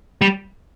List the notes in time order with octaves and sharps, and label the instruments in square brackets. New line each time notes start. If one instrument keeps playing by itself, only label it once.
[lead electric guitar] G3